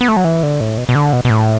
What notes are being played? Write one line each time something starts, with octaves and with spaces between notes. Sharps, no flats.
B3
A3
F#3
E3
D3
A2
B2
B2
D3
B2
B2
A2